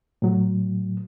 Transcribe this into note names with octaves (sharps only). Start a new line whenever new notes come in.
A2 F#3